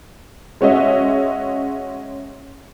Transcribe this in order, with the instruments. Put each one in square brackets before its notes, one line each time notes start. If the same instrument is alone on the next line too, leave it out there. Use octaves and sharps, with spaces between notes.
[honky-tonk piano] G#3 C#4 F#4 D#5 E5